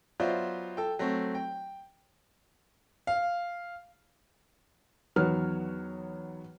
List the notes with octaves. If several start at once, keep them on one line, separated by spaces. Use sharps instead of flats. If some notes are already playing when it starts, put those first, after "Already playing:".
F#3 B3 F4 C5 D5 E5
A4 G5
F#3 A3 C4
G5
F5
E2 D#3 F#3 B3 C#5 F6